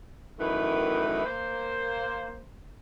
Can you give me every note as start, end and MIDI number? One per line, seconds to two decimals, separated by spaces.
0.39 1.21 42
0.39 1.21 45
0.39 1.21 51
0.39 1.21 52
0.39 1.21 57
0.39 1.21 71
1.25 2.44 58
1.25 2.44 72